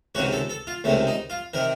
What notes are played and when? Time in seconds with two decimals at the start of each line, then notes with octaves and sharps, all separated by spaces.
0.15 C#2 C3 D#3 F#4
0.32 A4
0.50 A4
0.67 F4
0.84 C#2 C3 D#3 A3
1.07 D#4
1.30 F4
1.53 C3 D#3 A#4